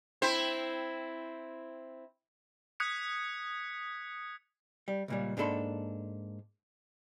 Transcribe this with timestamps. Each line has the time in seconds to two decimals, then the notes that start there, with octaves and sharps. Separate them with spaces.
0.22 C4 E4 C5
2.80 D#6 F#6 G#6 B6 C#7
4.88 G3
5.08 C#2 A#2 G3
5.37 G#2 A#3 D4 A4 B5 C6